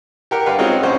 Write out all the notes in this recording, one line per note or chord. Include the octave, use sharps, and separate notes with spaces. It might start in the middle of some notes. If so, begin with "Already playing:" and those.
G4 A#4 F#5
G2 B4 F5
G#3 C4 C#4 D#4 F4 F#4
A#1 C#4 C5